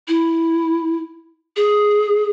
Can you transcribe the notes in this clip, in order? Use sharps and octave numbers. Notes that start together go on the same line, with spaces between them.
E4
G#4